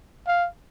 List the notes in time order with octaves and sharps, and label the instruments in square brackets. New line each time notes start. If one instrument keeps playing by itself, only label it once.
[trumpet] F5